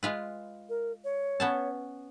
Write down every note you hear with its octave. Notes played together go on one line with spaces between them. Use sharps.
G#3 F4 B4
A#4
C#5
B3 C#4 A5